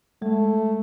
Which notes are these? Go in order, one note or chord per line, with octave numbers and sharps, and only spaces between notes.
G#3 A3